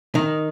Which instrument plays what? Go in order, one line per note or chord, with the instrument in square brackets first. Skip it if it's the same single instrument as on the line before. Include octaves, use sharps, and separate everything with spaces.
[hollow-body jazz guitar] D#3